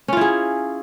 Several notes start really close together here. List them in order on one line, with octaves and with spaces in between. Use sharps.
C#4 F4 E4 G#4